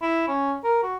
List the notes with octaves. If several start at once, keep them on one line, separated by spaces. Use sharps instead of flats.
E4
C#4
A#4
F#4